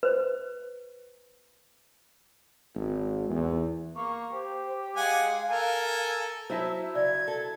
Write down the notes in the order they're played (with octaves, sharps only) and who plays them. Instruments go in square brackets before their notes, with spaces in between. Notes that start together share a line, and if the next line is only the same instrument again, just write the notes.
[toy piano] B4 C5
[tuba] G#1
E2
[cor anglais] A#3 [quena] C#6
[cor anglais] G4 [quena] C5
[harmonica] G#3 F#5 G#5 [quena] F5
[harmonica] A4 A#4 [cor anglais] G#5
[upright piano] F#3 E4 [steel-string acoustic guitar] C5 E5 A5 [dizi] E6
[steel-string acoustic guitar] G2 C#3 [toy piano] D5 [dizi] G#6
[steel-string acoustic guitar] A4